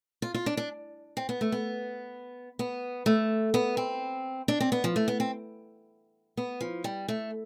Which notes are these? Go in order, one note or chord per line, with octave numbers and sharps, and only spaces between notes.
F4
F4
D4
D4
C4
B3
A3
B3
B3
A3
B3
C4
D4
C4
B3
F3
A3
B3
C4
B3
F3
G3
A3